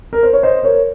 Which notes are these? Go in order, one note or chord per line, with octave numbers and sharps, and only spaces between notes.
A#4
C5
C#5
C5 D#5
A#4 C#5